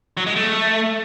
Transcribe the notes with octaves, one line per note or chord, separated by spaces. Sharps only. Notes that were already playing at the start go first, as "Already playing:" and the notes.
F#3
G#3
A3